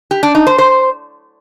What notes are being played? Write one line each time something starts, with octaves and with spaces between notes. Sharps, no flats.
G4
D4
D#4
C5
C5